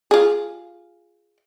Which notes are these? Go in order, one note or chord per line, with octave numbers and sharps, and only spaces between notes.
F4 G#4